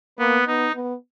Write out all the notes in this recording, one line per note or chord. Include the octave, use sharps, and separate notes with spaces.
A#3 B3
B3 D#4
B3